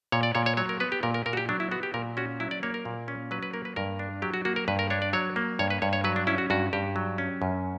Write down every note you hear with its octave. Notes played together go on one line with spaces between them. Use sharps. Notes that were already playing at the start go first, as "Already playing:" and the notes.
A#2 C#5
D5
A#2 C#5
C#5
F#3 C#5
A#4
B3 B4
G4
A#2 A#4
A#4
A#2 A#4
F#4
G4
F#3 D4
E4
B3 F#4
G4
A#2 A#4
C#4 F#4
F#3 E4
D5
A#3 C#5
A#4
A#2
C#4
F#3 B4
B4
A#3 A#4
B4
G2 A#4
D4
F#3 G4
F#4
A#3 F#4
A#4
G2 B4
A#4
D4 C#5
D5
F#3 C#5
A#3
G2 C#5
B4
G2 C#5
C#5
F#3 B4
D4
C#4 E4
F#4
G2 F#4
G2 G4
F#3
C#4
F#2